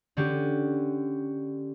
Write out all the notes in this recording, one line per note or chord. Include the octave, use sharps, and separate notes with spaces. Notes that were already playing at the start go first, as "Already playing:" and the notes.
D3 C#4 F#4 G4